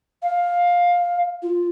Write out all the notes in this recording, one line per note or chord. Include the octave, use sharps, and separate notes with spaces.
F5
F4